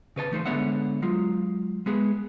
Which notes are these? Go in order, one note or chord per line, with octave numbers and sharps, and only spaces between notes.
C#3 B4 C#5 A5
E3 A3 D#4 A#4 C5
D3 G#3 B3 C#5 E5 F#5
F#3 G#3 F4
G#3 B3 G#4